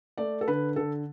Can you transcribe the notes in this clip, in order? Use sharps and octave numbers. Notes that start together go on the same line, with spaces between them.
A3 D5
A4
D3 B4
D3 A4